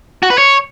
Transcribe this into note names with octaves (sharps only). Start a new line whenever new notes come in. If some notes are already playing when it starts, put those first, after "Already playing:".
F#4
B4
C#5